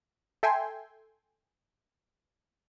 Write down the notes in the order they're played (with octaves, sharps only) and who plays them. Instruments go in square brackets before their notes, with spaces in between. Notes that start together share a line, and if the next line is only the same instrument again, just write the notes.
[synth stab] A4 E5 G5 G#5 C6